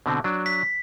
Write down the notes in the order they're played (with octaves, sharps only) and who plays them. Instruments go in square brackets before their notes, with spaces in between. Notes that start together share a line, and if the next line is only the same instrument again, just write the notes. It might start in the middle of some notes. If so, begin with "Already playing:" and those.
[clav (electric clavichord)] B2 D3 C4
F#3 D4
[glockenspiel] B6